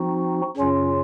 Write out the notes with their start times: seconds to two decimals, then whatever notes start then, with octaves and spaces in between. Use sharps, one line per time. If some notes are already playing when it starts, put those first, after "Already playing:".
Already playing: F3 C4 D#4 F#4
0.57 F#2 C#3 F#3 C#4 F4